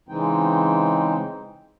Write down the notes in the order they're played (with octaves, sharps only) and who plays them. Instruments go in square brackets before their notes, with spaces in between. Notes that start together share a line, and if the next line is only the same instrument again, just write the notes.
[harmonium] C#3 E3 G#3 C4 D#4 G5